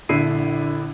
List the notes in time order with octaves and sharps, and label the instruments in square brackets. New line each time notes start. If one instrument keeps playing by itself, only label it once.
[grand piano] A#1 D3 E4 C7 D#7